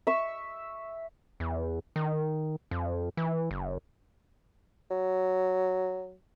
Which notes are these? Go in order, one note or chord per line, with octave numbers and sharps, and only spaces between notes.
E5 C#6 E6
E2
D#3
F2
E3
F#1
F#3